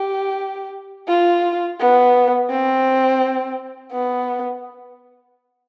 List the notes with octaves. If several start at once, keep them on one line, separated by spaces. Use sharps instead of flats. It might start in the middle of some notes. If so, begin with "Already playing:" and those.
Already playing: G4
F4
B3
C4
B3